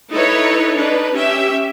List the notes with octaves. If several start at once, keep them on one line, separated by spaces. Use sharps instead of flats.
D#4 E4 A4 B4 C#5
D4 D#4 B4
C#4 G4 E5